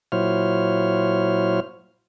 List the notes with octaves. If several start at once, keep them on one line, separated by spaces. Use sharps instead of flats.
A#2 F#3 E4 C5 C#5 F6